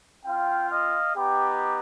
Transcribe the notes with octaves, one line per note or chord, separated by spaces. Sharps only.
C4 F4 F5 G5
D#5 F5
B3 D#4 G4